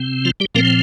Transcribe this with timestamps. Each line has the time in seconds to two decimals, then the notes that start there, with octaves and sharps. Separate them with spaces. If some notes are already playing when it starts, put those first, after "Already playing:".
Already playing: C3 C4
0.25 F3 F4
0.40 G3 G4
0.55 A#2 F3 A#3 C4 A#4